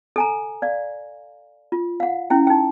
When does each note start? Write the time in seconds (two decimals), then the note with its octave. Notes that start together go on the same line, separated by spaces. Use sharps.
0.16 A4 G#5 A#5
0.62 D5 F5
1.72 F4
2.00 F5 F#5
2.30 C#4 E4 G5
2.47 D#4 G5